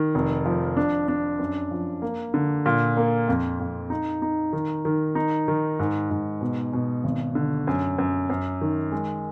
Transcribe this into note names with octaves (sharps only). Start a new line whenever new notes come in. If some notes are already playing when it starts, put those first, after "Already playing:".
Already playing: D#3
F1
F3
D4
D4
F#2
F3
A#3
D3
A#2
A#3
F2
F2
D#4
D#4
D#3
D#3
D#4
D#3
G#2
G#2
B2
B2
G#1
D3
F#2
F#2
F#2
D#3
G#3